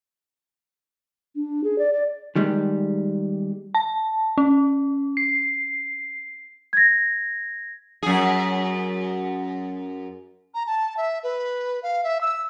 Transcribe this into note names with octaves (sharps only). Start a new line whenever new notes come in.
D4
G#4
D5
D5
D#3 G3 G#3
A5
C#4
C7
G#6 A#6
F#2 G#4
A#5
A5
E5
B4
F5
E5
E6